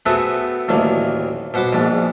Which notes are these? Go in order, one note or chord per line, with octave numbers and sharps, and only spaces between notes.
A3 B3 C4 F#4 G#4
A1 D2 D#3 A#3
B2 C5 F#5 B5 D6
A#1 G#2